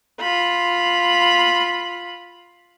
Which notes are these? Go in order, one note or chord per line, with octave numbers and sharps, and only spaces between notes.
F4 B5